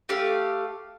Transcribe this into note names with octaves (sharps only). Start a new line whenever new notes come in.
A3 G4 F5